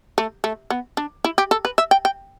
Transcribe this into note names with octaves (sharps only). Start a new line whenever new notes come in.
A3
A3
B3
D4
E4
G4
A4
B4
E5
G5
G5